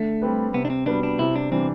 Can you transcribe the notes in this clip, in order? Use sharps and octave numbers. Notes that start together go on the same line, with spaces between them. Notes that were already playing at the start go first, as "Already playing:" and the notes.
Already playing: D3 A3
G3 C4 G4 B4
C3 B3
D4
C4
G3 B3 D4 F#4 B4
D4
C3 E4
D4
E3 G3 C4 D4